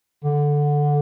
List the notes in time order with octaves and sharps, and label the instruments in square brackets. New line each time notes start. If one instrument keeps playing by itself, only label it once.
[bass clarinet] D3